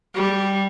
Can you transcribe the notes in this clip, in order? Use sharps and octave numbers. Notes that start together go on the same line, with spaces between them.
G3